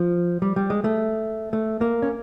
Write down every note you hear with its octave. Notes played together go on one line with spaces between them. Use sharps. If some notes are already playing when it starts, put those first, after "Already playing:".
Already playing: F3
G3
G3
G#3
A3
A3
A#3
C#4